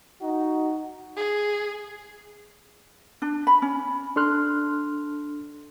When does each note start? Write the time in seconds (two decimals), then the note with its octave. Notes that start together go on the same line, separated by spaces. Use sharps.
0.21 D#4 F#4
1.17 G#4
3.22 D4
3.47 B5
3.62 C#4
4.16 D4 A4 C6 F6 F#6